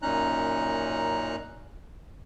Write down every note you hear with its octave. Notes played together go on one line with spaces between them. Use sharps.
F#2 A#2 C#4 D#4 A#5 F#6